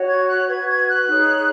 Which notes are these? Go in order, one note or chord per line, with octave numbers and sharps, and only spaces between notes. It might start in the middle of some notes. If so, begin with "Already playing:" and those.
Already playing: F#4 C#5
G#6
F#6
F#4 B4 G#6
G#6
F#6
D#4 G#4 C#5